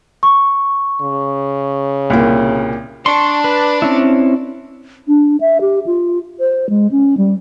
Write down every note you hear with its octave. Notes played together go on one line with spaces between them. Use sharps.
C#6
C#3
C2 A#2 A#3
D4 C6 C#6
B4
C4 C#4 E4
D4
E5
G4
F4
C5
G#3
C#4
G3